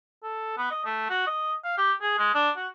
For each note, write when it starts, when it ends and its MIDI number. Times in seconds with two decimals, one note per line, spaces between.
0.23 0.56 69
0.57 0.70 59
0.71 0.82 75
0.85 1.05 57
1.10 1.25 66
1.27 1.53 75
1.64 1.75 77
1.78 1.93 67
2.02 2.16 68
2.19 2.31 56
2.35 2.50 62
2.57 2.68 66